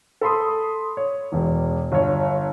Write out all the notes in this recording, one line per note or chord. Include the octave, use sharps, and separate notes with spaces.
A4 B5 C6 D#6
C#5
E1 E2
G1 C#5